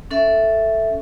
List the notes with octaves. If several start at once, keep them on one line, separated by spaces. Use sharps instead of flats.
C#4 A4 E5